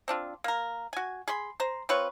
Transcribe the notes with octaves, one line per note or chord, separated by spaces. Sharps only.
C4 D4 F4
A#3 A#4
F#4 G#5
G#4 B5 C6
C5 A#5
C4 F4 B4 C#5